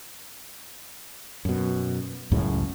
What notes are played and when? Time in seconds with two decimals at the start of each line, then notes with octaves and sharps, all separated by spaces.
1.45 F#2 B2
2.31 C#2 F#2 A2 C#3